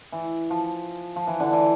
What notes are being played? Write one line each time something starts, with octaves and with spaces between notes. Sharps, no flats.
E3
F3
F3
E3
D3
E3